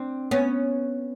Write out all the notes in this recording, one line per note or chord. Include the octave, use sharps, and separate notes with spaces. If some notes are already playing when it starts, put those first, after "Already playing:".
Already playing: C4 D4
B3 C#4